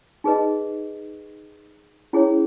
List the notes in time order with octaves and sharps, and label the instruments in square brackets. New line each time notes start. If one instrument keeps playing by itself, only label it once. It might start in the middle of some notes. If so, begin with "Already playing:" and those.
[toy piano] D#4 G#4 B4 D#5
C#4 E4 G#4 C#5